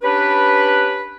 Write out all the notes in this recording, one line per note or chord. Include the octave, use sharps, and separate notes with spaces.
C#4 D4 G4 B4